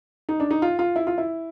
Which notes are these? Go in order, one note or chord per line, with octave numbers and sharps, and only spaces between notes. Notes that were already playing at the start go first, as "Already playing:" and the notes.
D#4
D4
D#4
F4
F4
E4
F4
E4